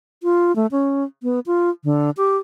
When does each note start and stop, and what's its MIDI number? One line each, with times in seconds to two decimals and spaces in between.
0.23 0.55 65
0.56 0.67 57
0.71 1.04 61
1.23 1.40 59
1.46 1.70 65
1.84 2.10 50
2.17 2.37 67